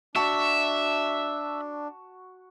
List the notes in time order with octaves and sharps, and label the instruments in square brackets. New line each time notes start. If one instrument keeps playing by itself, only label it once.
[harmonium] D4 [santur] F#4 A5 [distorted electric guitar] E5